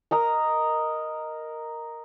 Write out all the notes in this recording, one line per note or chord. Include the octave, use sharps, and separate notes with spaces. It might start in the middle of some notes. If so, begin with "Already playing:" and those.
A#4 D#5 A#5